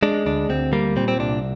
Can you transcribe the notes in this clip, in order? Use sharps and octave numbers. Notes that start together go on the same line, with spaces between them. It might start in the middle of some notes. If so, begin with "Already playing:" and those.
G#3 D4
D2 D4
D2 C4
G3 A#3
A#2 C4
C4
C2 D4